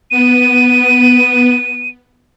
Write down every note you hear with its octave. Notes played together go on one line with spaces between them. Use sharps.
B3 D#7